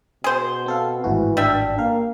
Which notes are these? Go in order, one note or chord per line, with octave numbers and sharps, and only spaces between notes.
B2 G#4 C5
C4 A4 F5
G#1 A2 E3 F#4
G3 D4 E5
A#3 A#4 F5